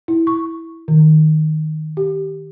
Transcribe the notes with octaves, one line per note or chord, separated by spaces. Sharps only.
E4
C#6
D#3
G4